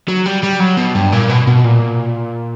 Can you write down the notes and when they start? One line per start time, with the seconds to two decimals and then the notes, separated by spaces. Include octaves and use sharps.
0.09 F#3
0.26 G3
0.44 G3
0.60 F#3
0.77 B2
0.95 G2
1.12 A#2
1.29 B2
1.47 B2
1.64 A#2